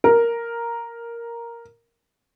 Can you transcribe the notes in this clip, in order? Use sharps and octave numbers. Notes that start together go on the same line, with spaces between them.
A#4